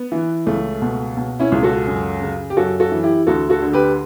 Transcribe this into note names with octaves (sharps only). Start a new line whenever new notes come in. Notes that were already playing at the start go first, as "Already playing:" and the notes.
Already playing: B3
E3
C#2 A3
B2
B2
C#4 E4
C#2
F#4 A4
F#2
C#3
G4
F#2 F#4 A4
F#4 A4
E3
E4 G4
D2 F#4 A4
F#4 A4
D3
G4 B4